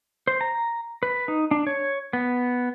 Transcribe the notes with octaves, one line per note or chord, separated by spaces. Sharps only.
C5
A#5
B4
D#4
D4
C#5
B3